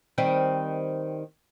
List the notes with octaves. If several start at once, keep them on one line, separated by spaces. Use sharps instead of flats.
D#3 G3 C4